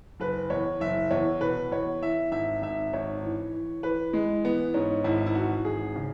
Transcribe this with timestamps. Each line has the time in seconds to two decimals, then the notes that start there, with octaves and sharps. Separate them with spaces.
0.20 F#1 B4
0.50 E2 C#5
0.80 F#1 E5
1.11 E2 C#5
1.41 B2 B4
1.72 E2 C#5
2.02 E3 E5
2.32 G#1 E5
2.62 G#1 E5
2.93 G#1 C#5
3.23 E3
3.53 E3
3.83 E3 B4
4.13 E3 G#3
4.45 E3 B3
4.74 G#2 C#4
5.04 G#1 E4
5.26 E4
5.35 E3 F#4
5.65 G#1 G#4
5.96 C#3